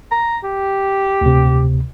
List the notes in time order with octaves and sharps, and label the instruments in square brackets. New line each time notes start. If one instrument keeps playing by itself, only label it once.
[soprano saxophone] A#5
G4
[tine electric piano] D2 C3